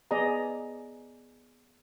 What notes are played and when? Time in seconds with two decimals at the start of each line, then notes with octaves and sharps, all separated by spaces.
0.11 B3 G#4 D5 D#5 A#5